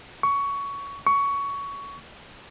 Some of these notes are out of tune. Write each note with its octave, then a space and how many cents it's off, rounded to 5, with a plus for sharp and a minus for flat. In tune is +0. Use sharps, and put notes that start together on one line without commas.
C#6 +15
C#6 +15